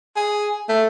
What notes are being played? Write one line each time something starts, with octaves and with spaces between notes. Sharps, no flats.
G#4
A3